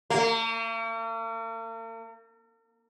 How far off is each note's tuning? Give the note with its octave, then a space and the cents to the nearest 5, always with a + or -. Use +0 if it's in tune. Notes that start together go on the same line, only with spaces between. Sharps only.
A#3 -45